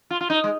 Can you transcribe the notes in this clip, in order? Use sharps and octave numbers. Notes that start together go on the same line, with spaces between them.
F4
F4
D#4
G#3